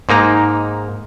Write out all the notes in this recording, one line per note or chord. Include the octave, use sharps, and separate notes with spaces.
G#2 A#3 D#4 A#5